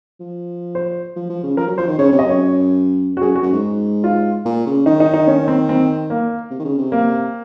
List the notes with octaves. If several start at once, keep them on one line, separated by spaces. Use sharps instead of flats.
F3
C5
F3
F3
C#3
F3 A#4
F#3
F3 C5
D#3
C#3 C#5
C#5
C3
D#5
F#2 C#5
F#4
F#2 G#4
F#4
F#2
G#2
F4
A#2
C#3
D#3 D#4
D#4
D#4
C#4
C4
C4
A#3
C3
D#3
C#3
C3
A#3